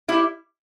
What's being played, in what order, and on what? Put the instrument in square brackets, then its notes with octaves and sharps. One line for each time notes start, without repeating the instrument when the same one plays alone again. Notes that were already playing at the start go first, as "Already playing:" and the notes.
[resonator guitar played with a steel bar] G3 E4